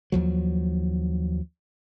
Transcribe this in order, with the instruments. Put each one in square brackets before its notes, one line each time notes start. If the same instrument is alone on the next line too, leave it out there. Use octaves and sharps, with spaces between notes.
[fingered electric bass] D#2 F3 F#3